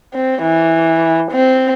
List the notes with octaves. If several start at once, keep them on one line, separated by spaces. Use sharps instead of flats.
C4
E3
C4